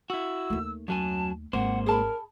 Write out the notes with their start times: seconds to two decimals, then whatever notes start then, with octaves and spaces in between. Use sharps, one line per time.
0.10 E4 F#4 E6
0.50 D#2 A3
0.88 F#2 F#3 G#5 A5
1.53 G#1 G#2 A#3 C5 F#5
1.86 G#4 A#4 A5 B5